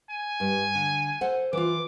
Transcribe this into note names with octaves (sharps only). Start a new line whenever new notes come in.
G#5
G2
D3
A4 C5 F#5
E3 F4 D6